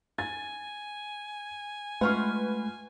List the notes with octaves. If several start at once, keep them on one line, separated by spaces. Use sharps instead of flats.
G#5 A6
G#3 A3 C#4 F4 B4 F#5 C6 C#6